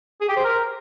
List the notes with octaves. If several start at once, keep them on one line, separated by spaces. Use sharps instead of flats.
G#4
G4
C5
A#4